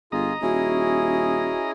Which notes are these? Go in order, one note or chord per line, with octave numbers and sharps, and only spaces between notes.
G1 F4 G#4 D#5 A#5
D#1 C#4 E4 F#4 G#4